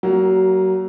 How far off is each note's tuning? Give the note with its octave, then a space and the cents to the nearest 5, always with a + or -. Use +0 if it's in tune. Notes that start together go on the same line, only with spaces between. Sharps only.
F#3 +30 A#3 +0